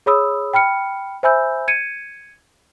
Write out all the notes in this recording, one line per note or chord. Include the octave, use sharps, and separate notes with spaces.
G#4 C#5 B5 D#6 E6
G5 B5 F6 C#7
C5 E5 G#5 B5 E6 G6
G#6 C#7 D#7